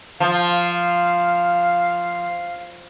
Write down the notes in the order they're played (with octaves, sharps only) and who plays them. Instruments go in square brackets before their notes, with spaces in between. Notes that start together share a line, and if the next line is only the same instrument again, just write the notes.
[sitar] F3 [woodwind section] F5